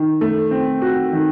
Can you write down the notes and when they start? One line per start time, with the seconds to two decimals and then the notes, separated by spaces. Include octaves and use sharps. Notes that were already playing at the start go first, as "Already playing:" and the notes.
Already playing: D#3
0.21 A3
0.51 C4
0.82 F#4
1.13 D#3